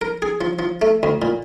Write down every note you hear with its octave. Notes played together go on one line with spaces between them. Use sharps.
A#4
G#4
F3
F3
A3
D2
A#2